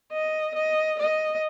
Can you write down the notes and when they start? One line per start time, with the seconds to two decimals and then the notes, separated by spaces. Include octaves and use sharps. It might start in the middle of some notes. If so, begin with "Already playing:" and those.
0.12 D#5
0.55 D#5
0.99 D#5